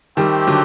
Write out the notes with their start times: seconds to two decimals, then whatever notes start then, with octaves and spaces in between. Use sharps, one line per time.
0.17 D#3 G3 A3 C4 G4
0.47 D3 F#3